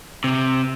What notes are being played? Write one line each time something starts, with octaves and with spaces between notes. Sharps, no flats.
C3